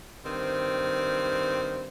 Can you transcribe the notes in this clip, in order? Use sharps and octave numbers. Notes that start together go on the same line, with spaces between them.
G2 D#3 C4